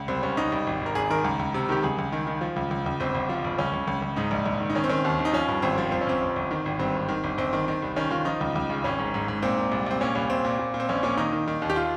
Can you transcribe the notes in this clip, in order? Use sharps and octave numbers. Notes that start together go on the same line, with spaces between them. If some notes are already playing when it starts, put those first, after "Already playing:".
Already playing: C#2
C2 C4
C2 C#4
C2 D#4
C2
G#1
G#1 A#4
G#1 G#4
D#3 A#4
C#2
C#2
C3
D#3 G4
C#2 G#4
C#2
D#3
D#3
F3
C#2
C#2
C#2
G1 C4
G1
F3
G1
C#2 C#4
C#2
C#2
C#2
G#2 D#4
A#1
A#1
D#3
D#4
D#3 C#4
C4
D#3 C#4
D#2
D#3
D#4
F3 C#4
G2
G#1 C4
F3
F2 C4
C#4
G1 C4
F2
G1
D#3
G#1
G2 C4
G#1
D#3
G1
G1 C4
D#3
D#3
C2
D#3 C#4
D#3 F4
F3 D#4
C#2
C#2
C#3
G#1 C#4
G#2
G#2
G#2
A#2 C4
A#2
C2
C2 C4
A#2 C#4
C2 C#4
C2 C4
A#2
A#2
A#2
C4
A#1 C#4
A#2 C#4
D#3 D#4
D#3
D#3
D#2
G4
F4